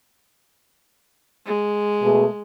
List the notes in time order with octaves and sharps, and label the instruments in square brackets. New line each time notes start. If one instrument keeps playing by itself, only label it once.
[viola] G#3
[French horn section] B2 A3 G#4